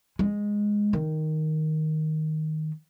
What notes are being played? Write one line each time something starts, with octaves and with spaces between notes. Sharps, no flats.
G#3
D#3